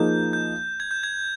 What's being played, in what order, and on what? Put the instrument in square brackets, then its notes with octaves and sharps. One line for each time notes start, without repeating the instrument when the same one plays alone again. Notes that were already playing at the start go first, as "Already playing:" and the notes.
Already playing: [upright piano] F3 A#3 D#4 G#4 [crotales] G6
[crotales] G6
G#6
G6
G#6